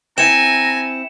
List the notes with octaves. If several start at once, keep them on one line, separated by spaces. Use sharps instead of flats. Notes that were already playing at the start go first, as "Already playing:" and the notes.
C4 E4 G#5 A#5 C#7 E7